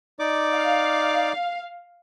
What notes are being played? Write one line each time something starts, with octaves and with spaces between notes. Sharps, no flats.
D#4 D5 D6
F5